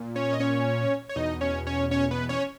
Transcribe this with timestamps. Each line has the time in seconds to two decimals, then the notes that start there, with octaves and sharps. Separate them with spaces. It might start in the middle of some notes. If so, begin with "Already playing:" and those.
Already playing: A#2
0.16 C#4 C#5
0.33 D#5
0.40 C#4 C#5
1.09 C#5
1.16 E2 B2 D#4 D#5
1.41 C#4 C#5
1.67 C#4 C#5
1.91 C#4 C#5
2.11 B3 B4
2.29 C#4 C#5